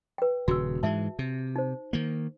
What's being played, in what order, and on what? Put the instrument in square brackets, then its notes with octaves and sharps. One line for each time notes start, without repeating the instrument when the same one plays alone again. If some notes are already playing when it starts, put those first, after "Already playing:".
[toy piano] B4 G5
[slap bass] D#1 C#3 [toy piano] F#4 E6
[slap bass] G#2 E3 G#3 [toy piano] E5 A5
[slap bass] C3
[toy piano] D#4 C5
[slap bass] D#3 A#3